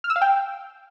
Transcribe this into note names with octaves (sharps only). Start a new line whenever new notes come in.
F6
E6
F5
G5